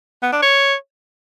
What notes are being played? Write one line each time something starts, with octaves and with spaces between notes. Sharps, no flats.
B3
D4
C#5